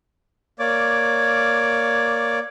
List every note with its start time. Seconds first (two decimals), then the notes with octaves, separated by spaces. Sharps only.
0.59 A#3 C#5 D5 D6